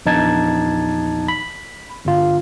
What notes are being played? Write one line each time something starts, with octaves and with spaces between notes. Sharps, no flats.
A#1 E2 D#4 A5 G#6
B5
G1 F4